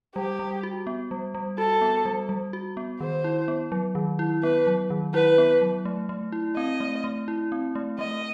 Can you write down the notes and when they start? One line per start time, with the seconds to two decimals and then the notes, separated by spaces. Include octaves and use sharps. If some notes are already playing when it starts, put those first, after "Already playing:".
0.15 G3 G4
0.39 G3
0.63 F#4
0.87 B3
1.11 G3
1.35 G3
1.58 F#4 A4
1.81 B3
2.05 G3
2.29 G3
2.53 F#4
2.77 B3
3.00 D#3 C5
3.24 E4
3.48 B3
3.72 F#3
3.95 D#3
4.19 E4
4.43 B3 B4
4.67 F#3
4.90 D#3
5.14 E4 B4
5.38 B3
5.62 F#3
5.85 A3
6.09 A3
6.32 E4
6.56 C4 D#5
6.80 A3
7.04 A3
7.28 E4
7.52 C4
7.75 A3
7.99 A3 D#5